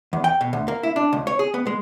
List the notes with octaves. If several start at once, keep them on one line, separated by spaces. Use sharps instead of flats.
E2
G5
B2
D2
A#3
E4
D4
C#2
C#5
G#4
B3
G#3